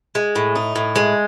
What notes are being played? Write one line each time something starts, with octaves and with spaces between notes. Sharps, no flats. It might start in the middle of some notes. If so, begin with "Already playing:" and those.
G#3
A2
D#4
A2
G#3